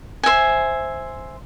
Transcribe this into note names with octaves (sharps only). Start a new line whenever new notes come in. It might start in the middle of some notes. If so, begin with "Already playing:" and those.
C5 E5 G#5